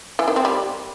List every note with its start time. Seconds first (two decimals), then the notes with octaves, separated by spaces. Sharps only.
0.19 E3
0.28 D#3
0.36 C4
0.45 G3